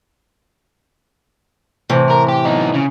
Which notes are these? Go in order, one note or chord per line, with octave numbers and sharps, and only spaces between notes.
A2 C3 E3
A#4
G4
B3 D#4
C#3